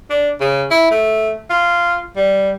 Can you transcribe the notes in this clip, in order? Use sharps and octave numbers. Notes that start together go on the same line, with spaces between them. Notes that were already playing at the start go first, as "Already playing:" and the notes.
D4
C#3
E4
A3
F4
G3